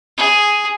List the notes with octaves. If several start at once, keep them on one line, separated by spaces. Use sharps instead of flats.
G#4